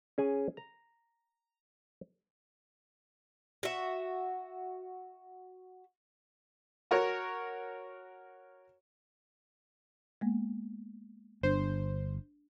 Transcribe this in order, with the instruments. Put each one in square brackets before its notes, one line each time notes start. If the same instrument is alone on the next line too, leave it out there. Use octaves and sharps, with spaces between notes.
[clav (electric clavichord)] C#4 G#4 G#5
A#5
[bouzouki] F#4 E5
[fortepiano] F#4 A#4 C#5
[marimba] G#3 A#3 B3
[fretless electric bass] G1 [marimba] D4 [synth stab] C5